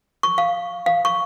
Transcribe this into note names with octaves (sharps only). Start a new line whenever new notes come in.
C#6
F5
F5
C#6